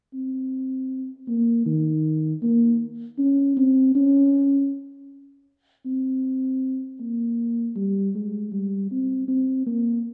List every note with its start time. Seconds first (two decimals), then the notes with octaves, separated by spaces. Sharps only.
0.14 C4
1.28 A#3
1.66 D#3
2.42 A#3
3.19 C#4
3.57 C4
3.95 C#4
5.86 C4
7.00 A#3
7.76 G3
8.15 G#3
8.52 G3
8.91 C4
9.28 C4
9.66 A#3